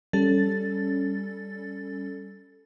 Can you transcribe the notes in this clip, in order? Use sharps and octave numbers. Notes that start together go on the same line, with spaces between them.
G3 C#4 A4 A6